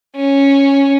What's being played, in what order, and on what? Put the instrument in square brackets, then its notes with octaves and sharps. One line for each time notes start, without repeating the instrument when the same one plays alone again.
[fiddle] C#4